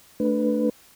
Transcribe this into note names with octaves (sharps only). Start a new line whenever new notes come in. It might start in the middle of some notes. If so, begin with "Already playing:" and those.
A3 D4 B4